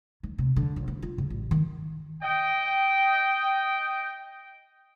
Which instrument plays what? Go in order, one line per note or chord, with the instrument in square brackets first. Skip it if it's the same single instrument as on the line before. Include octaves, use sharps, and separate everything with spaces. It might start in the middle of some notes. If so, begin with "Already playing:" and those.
[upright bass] D#3
C3
D3
A#1
E3
F4
C#3
A1
D#3
[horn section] D#5 G5